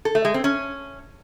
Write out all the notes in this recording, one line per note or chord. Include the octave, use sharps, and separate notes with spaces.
A4
A3
G#3
C4
C#4